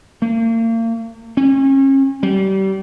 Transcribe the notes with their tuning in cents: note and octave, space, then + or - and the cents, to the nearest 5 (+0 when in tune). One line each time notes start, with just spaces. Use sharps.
A#3 -40
C#4 -35
G3 -30